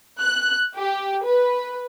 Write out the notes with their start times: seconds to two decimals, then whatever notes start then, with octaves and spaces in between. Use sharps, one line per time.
0.20 F#6
0.76 G4
1.25 B4